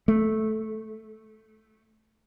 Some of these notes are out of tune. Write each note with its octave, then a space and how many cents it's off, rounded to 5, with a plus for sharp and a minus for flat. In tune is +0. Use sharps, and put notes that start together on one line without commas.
A3 -10